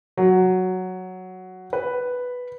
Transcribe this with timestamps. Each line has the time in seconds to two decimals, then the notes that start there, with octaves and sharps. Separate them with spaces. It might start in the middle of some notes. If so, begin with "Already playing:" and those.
0.17 F#3
1.73 B4